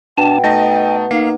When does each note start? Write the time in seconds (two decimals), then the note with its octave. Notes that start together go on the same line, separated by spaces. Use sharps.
0.18 B2 D4 G5 A5
0.44 A3 D#4 D#5 A5
1.11 A#3 D#4 F5